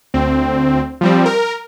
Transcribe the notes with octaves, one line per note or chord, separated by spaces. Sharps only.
D2 C4
F3 G3 C4
A#4